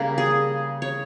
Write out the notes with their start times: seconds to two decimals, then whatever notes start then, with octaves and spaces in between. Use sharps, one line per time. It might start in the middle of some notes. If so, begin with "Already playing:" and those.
Already playing: C#3 G3 A#3 A#4
0.18 G#4
0.82 C#5